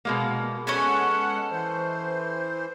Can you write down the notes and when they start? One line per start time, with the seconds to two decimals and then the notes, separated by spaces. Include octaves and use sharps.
0.05 B2 G#3 A#3
0.67 G#3 B3 C#4 A4 F#5 G#5
1.51 E3 C5